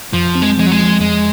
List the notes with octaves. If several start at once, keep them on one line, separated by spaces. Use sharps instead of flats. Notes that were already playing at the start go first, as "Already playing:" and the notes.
F2 F3
C4
G#3
F3 G#3
F#3
G#3
F3
F2 G#3